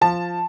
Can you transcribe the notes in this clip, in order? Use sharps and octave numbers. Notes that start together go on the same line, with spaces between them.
F3 A5